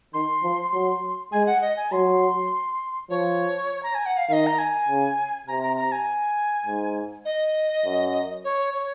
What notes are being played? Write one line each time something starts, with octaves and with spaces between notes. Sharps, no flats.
D#3 C6
F3
F#3
G#3 G#5
F#5
D#5
G#5
F#3 C6
F3 C#5
A#5
G#5
F#5
F5
D#3 D#5 F5
A#5
G#5
C#3
C3 A#5
A#5
A#5
G#5
G#2
D#5
F#2
C#5
C#5